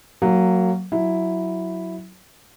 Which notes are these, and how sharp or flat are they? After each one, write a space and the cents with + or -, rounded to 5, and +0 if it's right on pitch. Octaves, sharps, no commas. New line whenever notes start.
F#3 +0 A#3 -20
F#3 +0 E4 +0